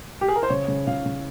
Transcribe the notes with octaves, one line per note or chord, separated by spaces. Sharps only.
G4
G#4
A#4
C5
C#3 C#5
C#3
C#3 F5
C#3